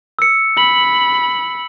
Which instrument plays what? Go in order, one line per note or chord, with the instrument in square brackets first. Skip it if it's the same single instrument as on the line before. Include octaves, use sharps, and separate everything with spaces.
[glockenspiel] E6 C#7
[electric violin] B5 [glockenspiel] F#7